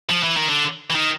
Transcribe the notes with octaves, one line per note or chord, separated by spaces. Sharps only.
F3
E3
D#3
D3
E3
D#3